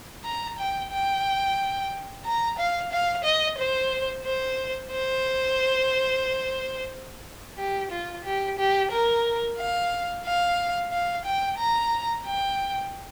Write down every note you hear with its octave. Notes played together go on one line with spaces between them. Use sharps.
A#5
G5
G5
A#5
F5
F5
D#5
C5
C5
C5
G4
F4
G4
G4
A#4
F5
F5
F5
G5
A#5
G5